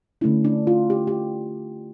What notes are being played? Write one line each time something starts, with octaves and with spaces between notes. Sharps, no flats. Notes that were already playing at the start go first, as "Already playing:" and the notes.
D3 A3 C#4 E4
D4
F4
G4
G4